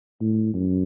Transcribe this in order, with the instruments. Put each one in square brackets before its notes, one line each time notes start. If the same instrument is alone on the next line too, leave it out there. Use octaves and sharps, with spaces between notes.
[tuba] A2
F#2